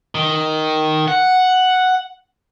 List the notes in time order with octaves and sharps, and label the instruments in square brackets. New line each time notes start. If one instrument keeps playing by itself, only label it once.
[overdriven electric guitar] D#3
F#5